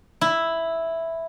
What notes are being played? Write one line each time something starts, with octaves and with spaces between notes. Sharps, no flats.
E4